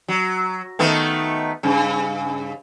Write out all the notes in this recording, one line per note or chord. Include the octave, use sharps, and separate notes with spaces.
F#3
D#3 A3 B3
G2 C#3